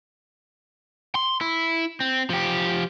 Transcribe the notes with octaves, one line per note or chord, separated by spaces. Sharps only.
C6
E4
C4
F3 G4